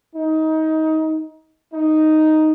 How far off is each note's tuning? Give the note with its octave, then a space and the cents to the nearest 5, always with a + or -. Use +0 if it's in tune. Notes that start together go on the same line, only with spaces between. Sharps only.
D#4 +20
D#4 +0